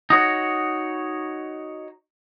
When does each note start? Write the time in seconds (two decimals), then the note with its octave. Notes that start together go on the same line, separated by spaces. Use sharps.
0.10 D#4 F#4 C#5